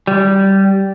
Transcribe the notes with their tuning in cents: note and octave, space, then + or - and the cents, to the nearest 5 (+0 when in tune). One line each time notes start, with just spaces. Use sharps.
G3 -10